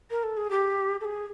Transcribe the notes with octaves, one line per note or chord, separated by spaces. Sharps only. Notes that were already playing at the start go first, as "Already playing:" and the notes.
A#4
A4
G#4
G4
A4
G#4